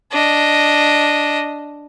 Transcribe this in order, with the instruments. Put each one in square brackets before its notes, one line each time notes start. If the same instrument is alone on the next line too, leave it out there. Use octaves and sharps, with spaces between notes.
[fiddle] D4 D#5